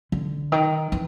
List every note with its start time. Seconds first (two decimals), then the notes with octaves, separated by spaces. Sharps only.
0.12 D3
0.52 D#3
0.92 E3